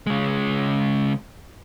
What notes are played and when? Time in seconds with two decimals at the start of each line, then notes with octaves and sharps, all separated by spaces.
0.07 C#3 G#3